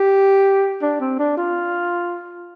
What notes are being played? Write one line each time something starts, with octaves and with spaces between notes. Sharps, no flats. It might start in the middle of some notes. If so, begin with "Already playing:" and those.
Already playing: G4
D4
C4
D4
F4